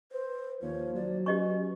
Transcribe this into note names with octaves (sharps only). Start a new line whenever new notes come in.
B4 C5
D#2 F3 C#5
F#3 D5
C#4 G4 B4 D#5 C#6